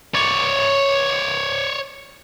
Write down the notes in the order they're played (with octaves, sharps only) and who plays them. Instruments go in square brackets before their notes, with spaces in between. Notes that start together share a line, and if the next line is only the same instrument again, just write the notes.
[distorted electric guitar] C#5 D5